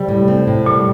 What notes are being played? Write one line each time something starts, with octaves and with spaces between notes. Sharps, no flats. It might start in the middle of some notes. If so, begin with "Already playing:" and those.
Already playing: C3 G3
A2
C4
A2
A#2 G3